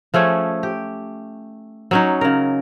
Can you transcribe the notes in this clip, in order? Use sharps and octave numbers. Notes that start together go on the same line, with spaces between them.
F3 A3 C#4 G#4
G4
F#3 C#4 D#4
C#3 A#4